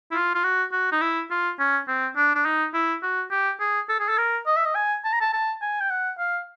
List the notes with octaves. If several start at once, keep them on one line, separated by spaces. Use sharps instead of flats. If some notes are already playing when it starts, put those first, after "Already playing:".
E4
F4
F4
F#4
F#4
D#4
E4
F4
C#4
C4
D4
D4
D#4
E4
F#4
G4
G#4
A4
G#4
A4
A#4
D#5
E5
D#5
G#5
A5
A#5
A5
A5
G#5
G5
F#5
F5